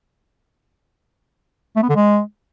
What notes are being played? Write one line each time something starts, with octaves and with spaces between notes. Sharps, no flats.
A3
B3
D3
G#3